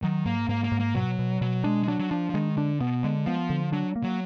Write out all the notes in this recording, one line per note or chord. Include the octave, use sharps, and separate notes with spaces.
D#3 F#3
G#2 A#3
G#2 A#3
A#3
G#2
A#3
B2 F#3
B2
B2 F#3
G#3 D4
G#3
F#3 D4
F#3
F3 D4
F3
D#3 G#3
D3 D4
B2 B3
D3 G#3
F3 B3
D3
F#3 D4
A#3
F#3